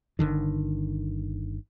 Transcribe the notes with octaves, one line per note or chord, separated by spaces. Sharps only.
G1 C2 D3 D#3